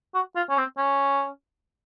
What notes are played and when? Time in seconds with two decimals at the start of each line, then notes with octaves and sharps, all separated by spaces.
0.14 F#4
0.35 F4
0.50 C#4
0.57 C4
0.77 C#4